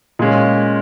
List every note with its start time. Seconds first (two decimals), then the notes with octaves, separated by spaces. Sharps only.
0.19 A#2 G#3 C#4